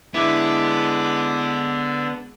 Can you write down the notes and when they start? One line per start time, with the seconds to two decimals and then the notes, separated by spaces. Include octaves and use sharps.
0.14 D3 G#3 B3 D4 E4 E5 D6